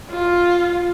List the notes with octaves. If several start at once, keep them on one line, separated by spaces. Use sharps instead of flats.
F4